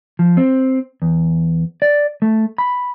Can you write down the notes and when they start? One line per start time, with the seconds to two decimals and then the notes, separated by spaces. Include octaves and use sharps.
0.19 F3
0.37 C4
1.02 E2
1.82 D5
2.22 A3
2.58 B5